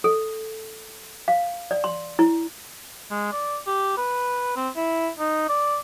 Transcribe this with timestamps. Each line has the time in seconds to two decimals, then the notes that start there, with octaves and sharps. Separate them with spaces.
0.04 A4
1.28 F5
1.71 D5
1.84 C6
2.19 E4
3.11 G#3
3.32 D5
3.67 G4
3.97 B4
4.57 C4
4.76 E4
5.19 D#4
5.49 D5